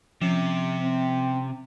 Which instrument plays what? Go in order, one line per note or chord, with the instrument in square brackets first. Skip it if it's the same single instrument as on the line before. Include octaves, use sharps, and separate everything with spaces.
[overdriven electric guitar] C3 [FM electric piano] F3 C#4 A6
[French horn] C4